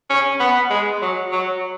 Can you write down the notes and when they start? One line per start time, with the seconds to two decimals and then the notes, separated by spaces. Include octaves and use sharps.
0.10 C#4
0.40 B3
0.70 G#3
1.02 F#3
1.32 F#3